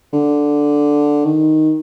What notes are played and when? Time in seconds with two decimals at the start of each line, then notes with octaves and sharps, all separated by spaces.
0.13 D3
1.24 D#3